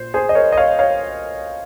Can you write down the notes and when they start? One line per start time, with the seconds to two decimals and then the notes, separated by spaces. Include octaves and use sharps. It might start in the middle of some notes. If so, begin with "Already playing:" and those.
Already playing: A#2 C5
0.14 G#4 C5
0.29 D#5
0.35 A#4 C#5
0.53 D#5
0.57 C#5 F5
0.79 C#5 F5